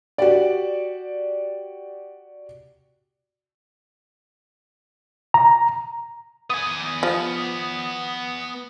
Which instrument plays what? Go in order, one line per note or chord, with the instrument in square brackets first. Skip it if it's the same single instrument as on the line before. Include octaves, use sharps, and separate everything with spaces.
[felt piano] F#4 G4 D5
[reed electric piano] A#5
[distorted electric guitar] B3 G#5 [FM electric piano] D#6
[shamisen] F3